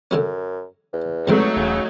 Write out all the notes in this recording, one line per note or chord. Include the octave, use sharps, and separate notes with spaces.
F#2 D3 F#3 C#4
E2
F2 D3 F#3 G#3 A3 D#4
E1 C#3